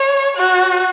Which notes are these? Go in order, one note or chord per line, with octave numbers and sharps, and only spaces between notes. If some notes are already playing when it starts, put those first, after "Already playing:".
Already playing: C#5
F#4